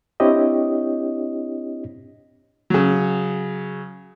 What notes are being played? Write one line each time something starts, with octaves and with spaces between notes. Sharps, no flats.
C4 D4 E4 G4 C#5 D#5
C#3 F#3